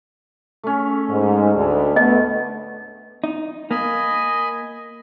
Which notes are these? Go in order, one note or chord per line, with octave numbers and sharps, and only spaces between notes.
A3 C#4
G#2
D2
A3 B3 D#5
D#4
A#3 D#5 G#5 B5